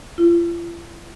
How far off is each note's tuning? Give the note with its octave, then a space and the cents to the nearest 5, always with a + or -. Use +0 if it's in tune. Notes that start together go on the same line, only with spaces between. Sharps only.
F4 -40